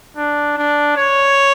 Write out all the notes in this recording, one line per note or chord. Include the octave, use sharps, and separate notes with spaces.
D4
D4
C#5